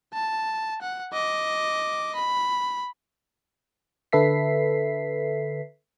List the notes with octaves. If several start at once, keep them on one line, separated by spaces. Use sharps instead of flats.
A5
F#5
D#5 D6
B5
D3 A4 B4 E5 B6 C7